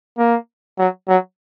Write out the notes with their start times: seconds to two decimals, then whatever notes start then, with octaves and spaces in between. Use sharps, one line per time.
0.18 A#3
0.78 F#3
1.08 F#3